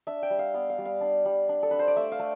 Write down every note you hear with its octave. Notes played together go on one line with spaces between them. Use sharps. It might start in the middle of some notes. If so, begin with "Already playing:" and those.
D4 E5
G5
G3
F5
B3 F5
F5
G3
F5
D4
G3
D4
A4
D4 B4
C5
D5
A3 E5
F5
A3